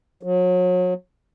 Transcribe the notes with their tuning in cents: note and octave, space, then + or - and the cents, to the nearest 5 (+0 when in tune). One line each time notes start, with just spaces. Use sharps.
F#3 -35